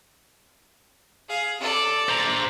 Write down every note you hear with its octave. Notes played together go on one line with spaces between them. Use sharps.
G#4 F5
A4 D5
C5 A#5